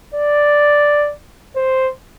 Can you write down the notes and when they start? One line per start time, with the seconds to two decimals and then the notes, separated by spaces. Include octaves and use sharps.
0.14 D5
1.56 C5